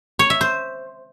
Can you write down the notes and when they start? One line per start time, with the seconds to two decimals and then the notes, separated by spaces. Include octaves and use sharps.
0.19 C#5
0.30 E5
0.41 C5